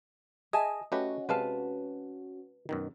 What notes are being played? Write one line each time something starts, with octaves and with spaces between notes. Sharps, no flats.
G#4 D#5 E5 G#5 A5
A3 C#4 F#4 G4 B4 D#5 F#5
C3 G#3 B4 F5 A5
F#2 B2 D#3